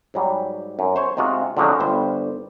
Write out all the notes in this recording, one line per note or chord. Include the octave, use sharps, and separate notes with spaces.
G#2 F#3 G3
F#2
C5 C#5
C3 G#3 F4 F#4
D3 F3 F#3 G#3 C4 C#4
G1 G3 C5